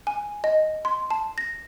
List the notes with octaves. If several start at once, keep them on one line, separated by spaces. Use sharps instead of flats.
G#5
D#5
C6
A5
A#6